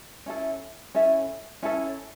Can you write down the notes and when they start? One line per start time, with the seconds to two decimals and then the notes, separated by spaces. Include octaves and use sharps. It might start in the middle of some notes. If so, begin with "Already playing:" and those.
0.26 C#4 E4 A4 E5
0.95 C#4 E4 A4 E5
1.63 C#4 E4 A4 E5